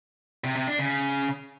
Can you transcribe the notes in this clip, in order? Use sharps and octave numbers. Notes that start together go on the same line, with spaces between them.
C3
C3
D4
C#3